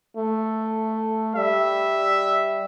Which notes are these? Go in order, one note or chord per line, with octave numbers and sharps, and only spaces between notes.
A3
G3 E5